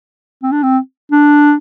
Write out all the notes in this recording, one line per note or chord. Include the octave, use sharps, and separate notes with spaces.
C4
D4
C4
D4